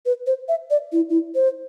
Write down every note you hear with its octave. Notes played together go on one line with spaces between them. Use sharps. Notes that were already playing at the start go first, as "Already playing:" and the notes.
B4
C5
E5
D5
E4
E4
C5